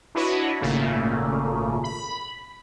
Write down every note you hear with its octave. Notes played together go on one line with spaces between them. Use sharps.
D4 E4 F#4 B4 C#5 D#5
G#1 A#2 C#3 A3 A#3
B5